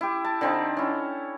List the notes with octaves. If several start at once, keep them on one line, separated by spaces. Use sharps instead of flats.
E4 G4
A5
D3 C4 D#4
C#4 E4